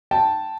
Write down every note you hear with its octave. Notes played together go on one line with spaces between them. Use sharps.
G5 A5